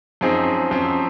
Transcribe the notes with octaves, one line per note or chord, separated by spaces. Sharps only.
F#2 F3 C4 D#4 G#4
F#2 F3 C4